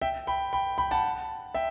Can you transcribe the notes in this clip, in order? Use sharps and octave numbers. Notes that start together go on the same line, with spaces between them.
E5 G5
G5 B5
G5 B5
G5 B5
F#5 A5
E5 G5